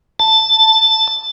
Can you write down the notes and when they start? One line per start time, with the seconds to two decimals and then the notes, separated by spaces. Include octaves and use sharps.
0.20 A5